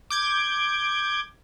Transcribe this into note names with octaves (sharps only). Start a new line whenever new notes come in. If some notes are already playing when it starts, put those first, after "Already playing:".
D6 G6 G#6